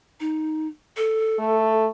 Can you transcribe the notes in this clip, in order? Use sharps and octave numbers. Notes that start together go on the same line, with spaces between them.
D#4
A4
A3